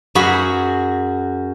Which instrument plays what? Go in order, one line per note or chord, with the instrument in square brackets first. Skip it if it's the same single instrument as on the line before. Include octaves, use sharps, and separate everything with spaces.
[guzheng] F#2 F#4 G#4 B5